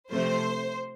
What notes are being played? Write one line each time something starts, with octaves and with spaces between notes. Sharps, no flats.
C3 F3 A3 C5